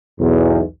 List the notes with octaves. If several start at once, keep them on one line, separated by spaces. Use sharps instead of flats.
B1 E2